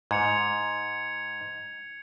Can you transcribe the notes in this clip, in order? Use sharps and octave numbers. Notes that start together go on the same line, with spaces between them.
G#2 G#6 C#7 F7